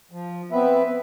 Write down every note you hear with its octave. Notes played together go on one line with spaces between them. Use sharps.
F3
B3 C4 B4 E5